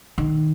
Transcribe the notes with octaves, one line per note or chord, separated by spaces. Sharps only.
D#3